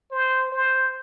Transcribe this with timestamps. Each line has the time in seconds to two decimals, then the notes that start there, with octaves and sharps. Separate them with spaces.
0.12 C5
0.52 C5